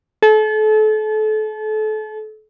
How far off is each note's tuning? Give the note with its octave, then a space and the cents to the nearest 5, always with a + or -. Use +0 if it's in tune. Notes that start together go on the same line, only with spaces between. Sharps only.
A4 -35